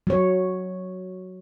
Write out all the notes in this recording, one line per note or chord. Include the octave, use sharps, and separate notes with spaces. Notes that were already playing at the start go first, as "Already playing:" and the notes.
F#3 C#5